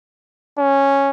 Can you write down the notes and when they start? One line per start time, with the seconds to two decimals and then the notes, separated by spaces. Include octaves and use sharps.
0.58 C#4